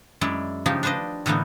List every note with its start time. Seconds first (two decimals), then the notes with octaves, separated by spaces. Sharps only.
0.21 F#2 G#3 E4 D5
0.66 C#3 F3 D#4 F4 G4
0.83 D4 B4 C5 D5 D#5
1.26 A2 D3 E3 A#3 B3 D#4